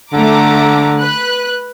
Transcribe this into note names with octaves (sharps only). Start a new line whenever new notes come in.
D3 A3 A#5 D6
B4 F#6